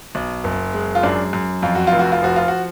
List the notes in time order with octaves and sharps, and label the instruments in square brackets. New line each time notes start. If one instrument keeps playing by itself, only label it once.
[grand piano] B1
F#1
G#3
F4
F#2 D4
F#2
F2 F4
F#4
F4
F1
F#4
F4
F3 F#4
F4
F#4